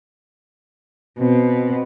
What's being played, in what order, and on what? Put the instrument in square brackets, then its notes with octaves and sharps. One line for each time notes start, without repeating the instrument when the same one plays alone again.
[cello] B2 [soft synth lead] C4